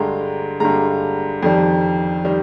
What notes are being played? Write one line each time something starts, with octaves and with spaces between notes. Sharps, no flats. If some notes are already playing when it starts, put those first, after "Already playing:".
Already playing: G2 D3 G#3 A#5
G2 D3 G#3 A#5
F2 D#3 G3
D#3 G3